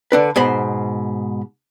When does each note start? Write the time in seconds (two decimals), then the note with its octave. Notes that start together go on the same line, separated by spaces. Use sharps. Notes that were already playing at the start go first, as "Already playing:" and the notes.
0.12 D3 D4 B4
0.36 G#2 B2 C5 B5